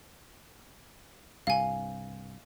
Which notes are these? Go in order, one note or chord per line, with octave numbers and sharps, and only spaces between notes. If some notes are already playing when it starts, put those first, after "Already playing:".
C2 G2 C3 F5 G#5